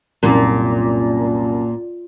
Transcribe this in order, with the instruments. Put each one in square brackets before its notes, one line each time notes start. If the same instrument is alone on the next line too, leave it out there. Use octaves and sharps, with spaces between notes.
[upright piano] C2 F#2 [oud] A#2